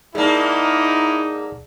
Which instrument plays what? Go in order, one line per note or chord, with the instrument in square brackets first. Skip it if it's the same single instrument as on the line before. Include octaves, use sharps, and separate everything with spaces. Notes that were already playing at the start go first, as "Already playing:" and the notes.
[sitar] G#2 A#3 [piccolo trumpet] D#4 [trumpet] E4 [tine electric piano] G#4 D5 A5